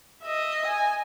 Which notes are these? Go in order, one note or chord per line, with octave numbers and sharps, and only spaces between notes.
D#5 E5
G#5